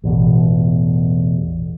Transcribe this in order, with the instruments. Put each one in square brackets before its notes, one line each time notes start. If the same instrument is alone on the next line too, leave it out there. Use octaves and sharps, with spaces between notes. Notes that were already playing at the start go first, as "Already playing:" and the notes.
[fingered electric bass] A1 E2 B2